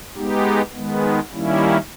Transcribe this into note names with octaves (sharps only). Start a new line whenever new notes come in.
G#3 B3 D#4 G4
D#3 G#3 B3
D#3 G3 A#3 C#4 E4